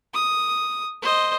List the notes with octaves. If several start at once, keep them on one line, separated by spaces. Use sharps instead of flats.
D#6
C5 D#5